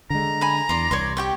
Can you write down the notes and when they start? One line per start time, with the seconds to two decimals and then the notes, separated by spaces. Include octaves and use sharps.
0.10 D3 G#3 A#5
0.41 G#5 B5
0.69 E2 D5 C6
0.91 C2 C#5 D5 C6
1.17 G4 G5 C#6